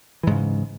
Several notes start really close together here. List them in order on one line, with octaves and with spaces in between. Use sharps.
E3 G#2 C#3